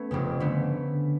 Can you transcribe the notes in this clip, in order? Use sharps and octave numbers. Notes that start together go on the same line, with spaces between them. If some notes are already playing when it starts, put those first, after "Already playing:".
Already playing: A3 B3 C#4
F1 F2 C#3
D3 A3 B3